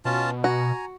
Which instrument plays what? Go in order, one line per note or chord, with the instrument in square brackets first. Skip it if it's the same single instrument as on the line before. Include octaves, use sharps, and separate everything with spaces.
[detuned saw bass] B2 [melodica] C#4 F4 A5
[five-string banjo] F#4 [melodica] G#5 A#5